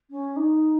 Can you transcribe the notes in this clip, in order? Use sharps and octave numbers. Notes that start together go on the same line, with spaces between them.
C#4
D#4